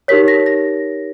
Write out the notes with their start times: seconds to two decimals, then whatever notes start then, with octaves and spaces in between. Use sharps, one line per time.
0.08 D#4 G4 A#4 C#5 B6
0.28 A#6
0.46 A#6